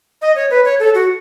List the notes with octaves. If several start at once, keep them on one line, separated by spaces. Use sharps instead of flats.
D#5
C#5
B4
C#5
A4
F#4